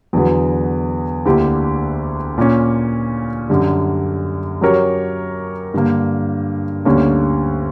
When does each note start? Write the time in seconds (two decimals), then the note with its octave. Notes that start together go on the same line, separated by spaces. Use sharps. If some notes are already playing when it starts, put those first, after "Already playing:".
0.13 E2 D3 F#3 B3
1.26 D2 D3 A#3 E4 G4
2.38 A#2 A#3 C#4
3.49 F#2 D3 G3
4.61 F#3 C#4 G4 A#4 C#5
5.74 G2 D3 A#3
6.85 D2 D3 G3 A#3 C#4